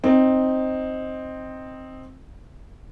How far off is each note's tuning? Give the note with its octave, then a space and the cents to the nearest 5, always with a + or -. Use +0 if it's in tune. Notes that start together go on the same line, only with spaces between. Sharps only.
C4 +5 D#4 +0